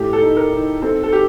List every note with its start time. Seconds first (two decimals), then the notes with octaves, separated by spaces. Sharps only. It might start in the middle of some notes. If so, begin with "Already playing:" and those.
Already playing: A2 A3 G4
0.13 A4
0.22 D#4
0.37 A#4
0.52 D#4
0.82 C4 A4
1.03 A4
1.12 G4